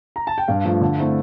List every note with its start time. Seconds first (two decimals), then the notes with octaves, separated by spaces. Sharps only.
0.16 A#5
0.27 A5
0.38 G5
0.48 G2 F5
0.65 F3 A3
0.81 D3
0.98 A3 C4 E4